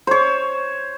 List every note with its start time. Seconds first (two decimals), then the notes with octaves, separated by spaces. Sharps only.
0.07 C5 C#5